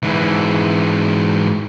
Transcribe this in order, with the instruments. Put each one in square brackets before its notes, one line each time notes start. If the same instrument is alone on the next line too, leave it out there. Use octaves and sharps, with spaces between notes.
[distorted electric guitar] G#2 E3